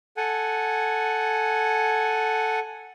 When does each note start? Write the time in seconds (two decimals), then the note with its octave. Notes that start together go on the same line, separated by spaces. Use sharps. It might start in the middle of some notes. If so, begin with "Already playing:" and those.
0.17 A4 F#5 G#5